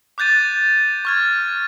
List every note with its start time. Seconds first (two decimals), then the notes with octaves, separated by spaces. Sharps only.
0.18 D6 F#6 G6 A6 D#7
1.05 C#6 F6 G#6